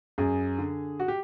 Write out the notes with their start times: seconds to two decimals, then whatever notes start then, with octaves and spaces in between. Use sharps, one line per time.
0.18 F#2 G#4
0.58 D3
1.00 F#4
1.08 G4